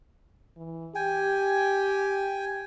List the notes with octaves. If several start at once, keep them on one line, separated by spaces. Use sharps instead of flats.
E3
G4 G5 G#5